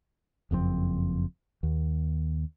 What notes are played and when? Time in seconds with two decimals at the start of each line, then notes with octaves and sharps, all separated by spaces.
0.51 F#1 F2 C3 C4
1.63 D#2